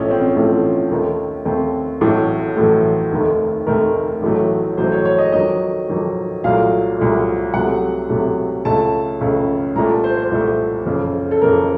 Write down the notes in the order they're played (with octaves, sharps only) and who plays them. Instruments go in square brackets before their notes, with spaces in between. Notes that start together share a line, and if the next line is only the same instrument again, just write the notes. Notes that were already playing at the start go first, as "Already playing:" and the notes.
Already playing: [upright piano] A1 A2 F3 A3 C#4
C4
C#4
A1 A2 F3 A3 C#4
D#2 D#3 A3
D#2 D#3 A3 C4
A1 A2 F#3 A3
A1 A2 F#3 A3 A4
F1 D#2 D#3 A3
F1 D#2 D#3 A3 A#4
A1 A2 F#3 A3
A1 A2 F#3 A3 C5
C#5
C#5
D#5
F2 D#3 F#3 D#5
F2 D#3 F#3
C2 A#2 F#3 A3 F5
C2 A#2 F#3 A3
C2 C3 F#3 A3 F#5
C2 C3 F#3 A3
C#2 C#3 A3 A5
C#2 C#3 A3
C2 A#2 A3 A#5
A5
C5
C5
C2 A#2 A3
F#1 F2 C#3
A4
F#1 F2 C#3 A#4